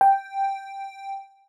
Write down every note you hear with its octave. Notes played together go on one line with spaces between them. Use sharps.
G5